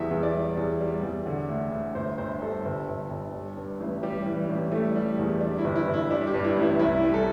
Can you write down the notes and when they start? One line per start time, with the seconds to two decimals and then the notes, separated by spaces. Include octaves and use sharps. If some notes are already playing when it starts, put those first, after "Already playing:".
Already playing: E2 G3 E5
0.11 E2
0.23 D5
0.34 G3
0.57 E2
0.81 G3
1.03 E2
1.26 D3
1.49 D2
1.72 D2
1.95 G1 C5
2.18 G1 C5
2.42 G3 A4
2.65 G1
2.88 G1
3.11 G1
3.34 G3
3.57 G2
3.80 A1
4.03 G3 G4
4.26 E3
4.37 G3
4.49 A1
4.72 G3 A3
4.96 G3
5.19 E2
5.41 G3 D4
5.58 E4
5.64 G1
5.76 E4
5.87 G1
5.94 E4
6.11 G3 D4
6.27 G4
6.34 G2
6.44 E4
6.57 A1
6.62 E4
6.79 C2 E4
7.03 G3
7.14 A4